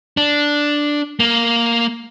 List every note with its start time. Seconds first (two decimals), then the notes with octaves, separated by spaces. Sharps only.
0.17 D4
1.20 A#3